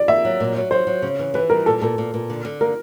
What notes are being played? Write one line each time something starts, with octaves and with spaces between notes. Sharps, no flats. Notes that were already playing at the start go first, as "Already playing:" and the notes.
Already playing: D5
A#3 E5
F#3
A#2
F#3
F#3 C5
F#3
C#3
E3
E3 B4
G3 A#4
A#2 A4
A#2 A4
A#2
A#2
D3
D3
A#3 A#4